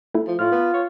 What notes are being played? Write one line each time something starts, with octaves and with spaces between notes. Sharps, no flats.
A3 E4
F3
A2 F4 F6
B3
C#5